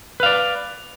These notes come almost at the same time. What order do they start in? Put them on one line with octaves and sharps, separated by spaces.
B4 F5 D5